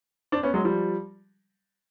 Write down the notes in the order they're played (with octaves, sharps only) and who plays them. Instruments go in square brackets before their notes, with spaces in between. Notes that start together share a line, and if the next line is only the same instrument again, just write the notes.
[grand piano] C4 D4
B3 C#4
F#3 G#3
F3 G3